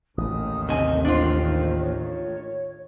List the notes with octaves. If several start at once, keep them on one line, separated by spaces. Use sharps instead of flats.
A1 D#2 A2 D#3 D#6
C3 D#5 G#5
D4 F4 C5
C#5